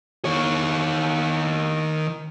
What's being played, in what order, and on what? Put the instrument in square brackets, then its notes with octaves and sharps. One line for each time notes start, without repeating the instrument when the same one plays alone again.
[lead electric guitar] D#3 C#5